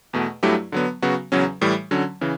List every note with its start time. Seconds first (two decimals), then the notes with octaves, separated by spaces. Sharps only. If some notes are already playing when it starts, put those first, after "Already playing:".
0.13 E2 B2 A3
0.43 G2 F#3 A3 E4 G4
0.72 D3 F#3 B3
1.02 C#3 F#3 B3 F#4
1.32 E2 C#3 F#3 C#4
1.61 A2 E3 G3
1.91 D3 F#3 C#4
2.21 C#3 E3